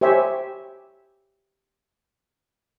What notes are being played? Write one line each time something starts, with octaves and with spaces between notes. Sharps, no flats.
G4 C5 C#5 E5 G#5